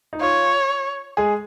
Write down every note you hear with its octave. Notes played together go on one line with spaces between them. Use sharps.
D#4
F4 C#5
G#3 G#4